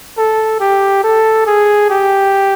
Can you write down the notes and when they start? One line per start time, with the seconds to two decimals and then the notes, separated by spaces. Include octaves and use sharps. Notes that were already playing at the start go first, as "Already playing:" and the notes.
0.17 A4
0.60 G4
1.04 A4
1.46 G#4
1.90 G4